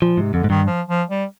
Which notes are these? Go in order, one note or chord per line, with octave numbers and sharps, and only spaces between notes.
A#2 F3
G#2 C3
F2 D3
G#2
G2 D#3
F3
F3
G3